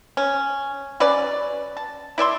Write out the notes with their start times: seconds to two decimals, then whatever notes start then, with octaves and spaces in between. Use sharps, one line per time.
0.17 C#4
1.00 F#3 C#4 B4 D5
1.77 A5
2.18 E4 D5 E5 C6